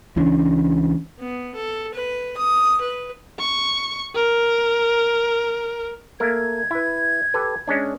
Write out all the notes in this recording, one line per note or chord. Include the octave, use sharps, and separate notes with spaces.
C#2 E3 C#4 D4
B3
A4
B4
D#6
B4
C#6
A#4
A3 A#3 A#4 G#6
E4 B4
G4 A4 B4
G#3 C#4 D4